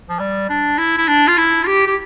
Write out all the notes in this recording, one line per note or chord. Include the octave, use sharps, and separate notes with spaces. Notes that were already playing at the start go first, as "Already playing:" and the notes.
F3
G3
D4
E4
E4
D4
F4
E4
F4
G4
G4